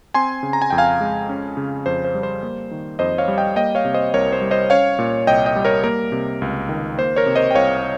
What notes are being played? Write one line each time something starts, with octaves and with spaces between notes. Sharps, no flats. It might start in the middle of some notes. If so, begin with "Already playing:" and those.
C4 G#5 C6
C#3
A#5
G#5
F2 G5
F5 G#5
G#3
C#4
C#3
F2 C5
C5
G3
C5
A#3
D#3
F2 C5 D#5
C#5 F5
G3
D#5 G5
A#3 D#5 G5
C#5 F5
C3
C5 D#5
C2 A#4 C#5
C5
G3
C5 D#5
C#4 C#5 F5
A#2
C2 D#5 G5
D#5 G5
G3
A#4 C#5
A#3 A#4
C3
C#2
D#3
A#3 C5
A#4 C#5
C3
C5 D#5
G5
C2 C#5 F5